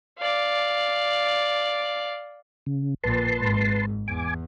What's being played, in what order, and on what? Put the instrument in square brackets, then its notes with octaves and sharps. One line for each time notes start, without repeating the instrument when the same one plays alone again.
[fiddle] D5 F5
[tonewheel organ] C#3
[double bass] A#1 A#2 [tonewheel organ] B4 A5 C6
[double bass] G#1 G#2
[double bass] E2 [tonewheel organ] G#5 D6